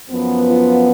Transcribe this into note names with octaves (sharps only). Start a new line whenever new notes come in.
F#2 F3 B3
F4